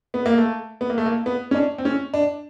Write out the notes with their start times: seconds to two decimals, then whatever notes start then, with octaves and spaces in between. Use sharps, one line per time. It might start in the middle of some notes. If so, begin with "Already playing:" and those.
0.14 B3
0.26 A#3
0.38 A3
0.81 B3
0.90 A#3
0.98 A3
1.06 A#3
1.26 B3
1.51 C#4
1.55 D4
1.78 C4
1.85 C#4
2.14 D4